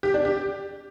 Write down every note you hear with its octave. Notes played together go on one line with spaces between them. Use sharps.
G4
D4
G4